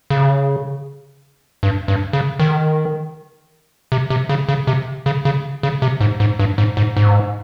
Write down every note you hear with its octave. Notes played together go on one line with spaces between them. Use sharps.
C#3
G2
G2
C#3
D#3
C3
C3
C#3
C#3
C3
C#3
C#3
C#3
C3
G#2
G#2
G2
G#2
G#2
G#2